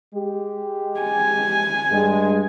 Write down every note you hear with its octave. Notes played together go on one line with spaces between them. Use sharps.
G#3 G4
G#5
G2 G#3